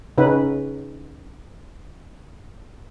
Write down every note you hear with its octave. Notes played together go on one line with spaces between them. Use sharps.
C#3 C#4 D#4 B4